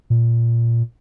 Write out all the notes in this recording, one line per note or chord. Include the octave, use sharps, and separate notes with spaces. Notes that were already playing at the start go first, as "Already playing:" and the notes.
A#2